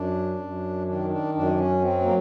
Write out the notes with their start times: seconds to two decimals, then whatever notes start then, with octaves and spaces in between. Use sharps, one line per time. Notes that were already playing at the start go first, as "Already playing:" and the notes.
Already playing: F#2 D4
0.40 F#2
0.87 D#3 D4
1.10 D4
1.35 F#2 D4
1.58 C#4
1.82 F#3 C4
2.02 A#3